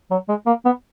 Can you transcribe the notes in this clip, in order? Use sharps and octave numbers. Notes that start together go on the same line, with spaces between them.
F#3
G#3
A#3
B3